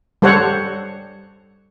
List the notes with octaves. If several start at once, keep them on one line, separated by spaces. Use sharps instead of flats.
G3 A4 C5 C#5 F#5